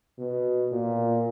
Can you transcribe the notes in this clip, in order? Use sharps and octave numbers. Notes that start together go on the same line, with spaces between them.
B2
A#2